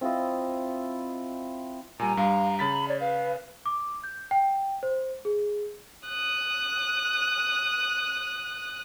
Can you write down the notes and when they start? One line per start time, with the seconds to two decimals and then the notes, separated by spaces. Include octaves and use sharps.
0.01 C4 E4 F4 D#5
1.99 A#2 G3 G#5 A#5
2.17 G2 G3 F5
2.59 C#3 B5 A6 B6
2.88 C#5 D5
3.00 B4 F5
3.66 D6
4.03 G6
4.31 G5
4.83 C5
5.25 G#4
6.08 D#6 F#6